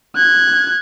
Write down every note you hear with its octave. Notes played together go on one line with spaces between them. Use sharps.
F#6 G#6